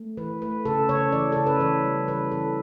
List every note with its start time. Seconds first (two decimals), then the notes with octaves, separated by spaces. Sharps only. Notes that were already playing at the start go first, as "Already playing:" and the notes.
Already playing: A3
0.17 E3 B4
0.42 A3 B4
0.65 C#3 A4
0.89 C#3 C#5
1.12 E3 D5
1.32 C#3 A4
1.47 B4
1.60 E3 C#5
1.84 G3
2.08 E3 B4
2.31 E3 A4